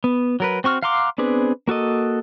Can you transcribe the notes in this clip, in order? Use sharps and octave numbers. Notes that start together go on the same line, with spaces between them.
B3
F#3 A#4 B4
C4 F#4 C#6 F6
F5 F#5 A#5 C6 D6
B3 C4 D4 G#4 B4
A#3 F#4 A4 D#5